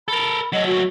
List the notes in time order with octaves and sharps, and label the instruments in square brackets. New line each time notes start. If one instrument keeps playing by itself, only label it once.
[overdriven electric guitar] A4 A#4 [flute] B5
[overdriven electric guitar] F#3 A3 [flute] D#5
[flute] F#4